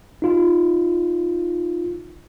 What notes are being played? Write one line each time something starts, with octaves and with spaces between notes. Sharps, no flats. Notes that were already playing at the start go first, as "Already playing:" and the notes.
D#4 F4